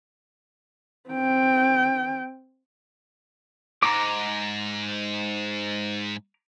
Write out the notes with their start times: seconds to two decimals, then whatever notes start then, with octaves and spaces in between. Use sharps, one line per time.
1.10 C4 G5
3.83 G#2 A#5 D6